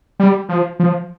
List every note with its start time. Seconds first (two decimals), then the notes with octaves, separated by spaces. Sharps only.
0.20 G3
0.49 F3
0.80 F3